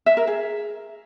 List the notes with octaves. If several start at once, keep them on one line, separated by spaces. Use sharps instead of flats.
E5
A#4
G#4